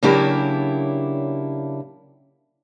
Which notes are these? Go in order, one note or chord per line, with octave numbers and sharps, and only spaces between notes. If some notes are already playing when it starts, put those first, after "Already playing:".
C#3 F#3 A#3 D4 E4 G4